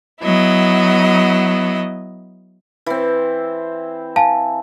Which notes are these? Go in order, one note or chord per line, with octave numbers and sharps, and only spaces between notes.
F#3 B3 E4 D#5
E3 C4
F5 G#5 A5